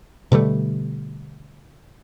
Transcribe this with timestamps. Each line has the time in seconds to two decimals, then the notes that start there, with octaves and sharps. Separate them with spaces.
0.32 B2 D3 G3 A3